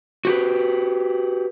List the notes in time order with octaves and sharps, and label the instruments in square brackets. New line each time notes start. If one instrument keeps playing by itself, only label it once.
[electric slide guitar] F#4 G4 B4